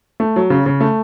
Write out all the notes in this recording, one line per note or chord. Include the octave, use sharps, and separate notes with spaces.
A3
F#3
C#3
C#3
A3